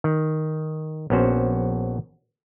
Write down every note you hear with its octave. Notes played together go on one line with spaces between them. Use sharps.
D#3
A#1 B3 C#4 F#4 C5